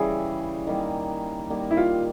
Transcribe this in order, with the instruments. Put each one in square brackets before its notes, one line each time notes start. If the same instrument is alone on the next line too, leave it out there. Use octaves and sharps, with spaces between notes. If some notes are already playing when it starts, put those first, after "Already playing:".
Already playing: [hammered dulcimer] C#3 E3 G3 [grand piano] G#4
[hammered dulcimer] D#3 G3 A#3
D#3 G3 A#3
[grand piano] E4
F4